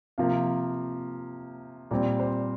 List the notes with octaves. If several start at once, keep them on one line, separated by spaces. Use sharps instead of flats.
C3 F3 A#3 F5
A#2 G3 C4 D5
C5